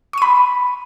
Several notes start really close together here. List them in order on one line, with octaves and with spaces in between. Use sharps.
C#6 D#7 B5